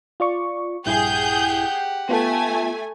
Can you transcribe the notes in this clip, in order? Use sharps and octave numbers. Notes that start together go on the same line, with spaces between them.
F4 D5 C#6
A#1 G2 E4 G4 G#4 F#5 G6
A3 B3 F4 G#5